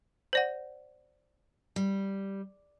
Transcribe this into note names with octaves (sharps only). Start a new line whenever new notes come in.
C5 D5 F#5
G3